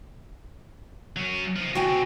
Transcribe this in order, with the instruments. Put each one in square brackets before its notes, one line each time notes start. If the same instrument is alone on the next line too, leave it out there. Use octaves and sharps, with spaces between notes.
[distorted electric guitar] F#3 C#4
F3 D#4
[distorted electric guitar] D2 [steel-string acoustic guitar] F#4 G5 G#5
[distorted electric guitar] B2 C4